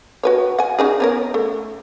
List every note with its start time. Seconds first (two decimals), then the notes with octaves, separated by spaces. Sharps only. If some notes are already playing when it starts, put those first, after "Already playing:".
0.23 F#4 B4 C#5
0.59 F#5 G#5
0.79 C#4 D#4 G#4
1.00 B3 C#4 A#4
1.34 A3